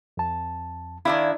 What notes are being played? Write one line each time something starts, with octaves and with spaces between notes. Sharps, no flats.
F2 A5
D#3 D4 E4 F5 B5 G#6